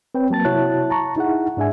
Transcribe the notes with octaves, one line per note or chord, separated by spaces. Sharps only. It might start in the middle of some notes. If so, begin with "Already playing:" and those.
C4 B4 C#5 G5
F#3 A#3 A5 A6
C3 E4 F#4 C#5 A5 F#6
A5 A#5 C#6
D#4 E4 G#4 F#5
G#2 D4 G#4 E5 G#5